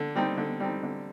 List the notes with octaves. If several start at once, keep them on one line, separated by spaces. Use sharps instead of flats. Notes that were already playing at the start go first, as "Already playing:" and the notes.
Already playing: D3
G3 C4 D#4
D3
G3 C4 D#4
D3